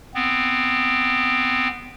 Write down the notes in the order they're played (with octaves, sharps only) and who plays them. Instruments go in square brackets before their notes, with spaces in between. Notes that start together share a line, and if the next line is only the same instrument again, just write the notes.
[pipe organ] B3 C4